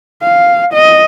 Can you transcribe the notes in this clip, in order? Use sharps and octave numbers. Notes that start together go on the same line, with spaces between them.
F5
D#5